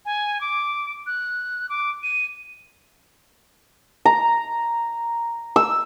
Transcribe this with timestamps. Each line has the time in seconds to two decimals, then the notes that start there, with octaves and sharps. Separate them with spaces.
0.05 G#5
0.41 D6
1.07 F#6
1.69 D6
2.03 D#7
4.05 A#5
5.56 E6